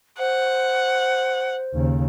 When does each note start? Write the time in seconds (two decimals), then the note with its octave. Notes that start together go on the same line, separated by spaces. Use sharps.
0.19 C5 F#5
1.74 D#2 C#3